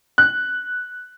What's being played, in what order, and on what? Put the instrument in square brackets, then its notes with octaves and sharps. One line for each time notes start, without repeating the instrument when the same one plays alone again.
[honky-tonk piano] F#6